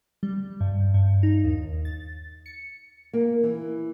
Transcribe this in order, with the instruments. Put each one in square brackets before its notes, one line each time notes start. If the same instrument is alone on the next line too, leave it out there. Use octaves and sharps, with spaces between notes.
[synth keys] G3
G2
G2
D#4
D#2
A6
C#7
[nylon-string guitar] A#3
E3